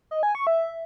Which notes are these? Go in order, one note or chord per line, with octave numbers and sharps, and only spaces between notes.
D#5
G#5
C#6
E5